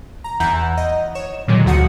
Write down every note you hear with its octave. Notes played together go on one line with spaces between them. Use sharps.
A#5
E2 E3 E4 F#5 A#5 G6
D#5
C#5 E7
A#2 D3 D#3 F#3 G#3
D2 F3 F#4 F#5 D#6 C#7